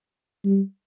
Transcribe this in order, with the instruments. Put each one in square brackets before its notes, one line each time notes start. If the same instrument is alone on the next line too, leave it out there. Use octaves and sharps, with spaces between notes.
[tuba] G3